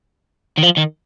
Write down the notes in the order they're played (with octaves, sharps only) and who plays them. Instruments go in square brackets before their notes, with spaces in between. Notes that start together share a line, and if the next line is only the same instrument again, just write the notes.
[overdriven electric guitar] D#3
F3
D#3